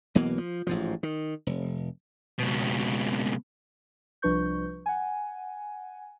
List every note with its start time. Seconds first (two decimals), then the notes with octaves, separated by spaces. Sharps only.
0.15 B1 B2 E3 A#3
0.38 F3
0.67 A1 G#2 F3
1.03 D#3
1.47 F1
2.39 C#2 B2
4.22 C2 F3 D4 B4 C#6 G6
4.86 F#5 G#5